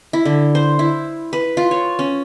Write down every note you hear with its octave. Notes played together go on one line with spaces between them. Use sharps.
E4
D3
C5
E4
B4
F4
C#5
C#4